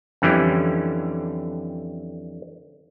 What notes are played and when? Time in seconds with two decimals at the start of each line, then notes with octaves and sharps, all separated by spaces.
0.22 F2 D3 E3 G3 C#4